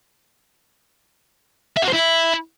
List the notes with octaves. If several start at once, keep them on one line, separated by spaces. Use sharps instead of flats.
E5
F#4
C5
E4